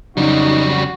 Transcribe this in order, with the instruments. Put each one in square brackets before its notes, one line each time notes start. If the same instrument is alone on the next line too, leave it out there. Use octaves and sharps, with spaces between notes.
[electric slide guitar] F2 C#3 [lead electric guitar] F#3 G3 [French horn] D#4 [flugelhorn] F#4